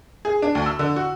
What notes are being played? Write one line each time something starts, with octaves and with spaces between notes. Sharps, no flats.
G#4
D4
D2
E6
D3
F#4